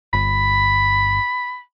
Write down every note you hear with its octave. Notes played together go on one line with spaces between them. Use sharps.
G1 B5